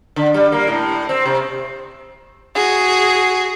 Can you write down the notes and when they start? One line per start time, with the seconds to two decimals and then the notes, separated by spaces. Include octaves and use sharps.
0.16 D3
0.34 G3
0.52 A#3
0.67 A2
1.09 C4
1.26 C3
2.55 F#4 G#4